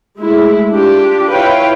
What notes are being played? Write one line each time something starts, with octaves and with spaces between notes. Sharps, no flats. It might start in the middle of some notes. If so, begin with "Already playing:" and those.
G#3 A3 E4
D4 F4 G4
E4 F4 B4 C#5 F5 G5